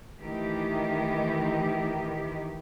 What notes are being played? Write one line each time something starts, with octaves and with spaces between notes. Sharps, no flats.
D#3 E3 A3 D#4 G4